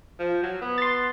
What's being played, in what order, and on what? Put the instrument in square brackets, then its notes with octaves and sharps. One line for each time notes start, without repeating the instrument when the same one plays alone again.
[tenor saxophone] F3
F#3
B3
[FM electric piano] C6 A6